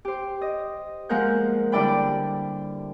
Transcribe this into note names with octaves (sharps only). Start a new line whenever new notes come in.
G4 C5
D#5
F3 G#3 A#3 A#4 F#5 G6
D3 G3 E4 D5 G5 B5